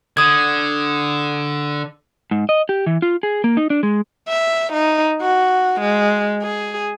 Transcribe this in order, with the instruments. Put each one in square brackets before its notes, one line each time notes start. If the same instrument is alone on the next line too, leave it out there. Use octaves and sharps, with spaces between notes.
[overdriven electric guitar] D3 [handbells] D#6 G#6
[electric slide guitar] G#2
D#5
G4
E3
F4
G#4
A#3
D#4
D4
G#3
[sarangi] E5
D#4
F#4
G#3
G#4